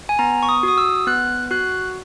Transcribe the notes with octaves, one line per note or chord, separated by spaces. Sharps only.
G#5
B3 A#5
C#6
D#6
F#4
D#6
E6
B3 F#6
F#4 F#6